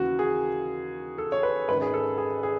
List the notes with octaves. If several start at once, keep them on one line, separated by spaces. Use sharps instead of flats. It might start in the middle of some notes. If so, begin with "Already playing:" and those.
Already playing: D#2 C#3 E3 F#4
G#4
A4
C#5
B4
G#1 F#2 D#3 B4
G#4
A4
G#4
G#4